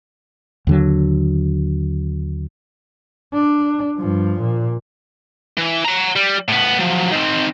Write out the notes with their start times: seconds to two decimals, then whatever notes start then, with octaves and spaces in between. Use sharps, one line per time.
0.67 D#2 D3 F#3
3.33 D4
3.98 G2 F3
4.41 A#2
5.57 E3
5.85 F#5 A#5
6.16 G3
6.48 A2 B3
6.79 F3 F#3
7.12 D#3 C4